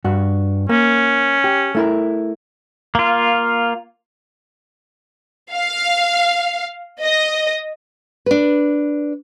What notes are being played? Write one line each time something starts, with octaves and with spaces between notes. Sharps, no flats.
G2 F#4
A#3 C#4
G4
A3 E4 A#4
A#3 F4
F5
D#5
D4 B4